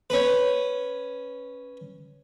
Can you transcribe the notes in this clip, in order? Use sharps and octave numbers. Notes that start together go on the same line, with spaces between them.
C#4 B4